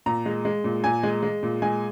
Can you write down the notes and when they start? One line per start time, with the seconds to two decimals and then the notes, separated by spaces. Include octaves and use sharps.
0.06 A#2 A#5
0.26 G#3
0.45 G#3
0.64 A#2
0.84 A#2 G#5
1.03 G#3
1.22 G#3
1.43 A#2
1.62 G#3 G#5